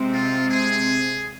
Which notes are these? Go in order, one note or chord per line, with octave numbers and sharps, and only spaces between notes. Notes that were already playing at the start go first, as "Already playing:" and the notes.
Already playing: C3 G#3 C4
F4
G#4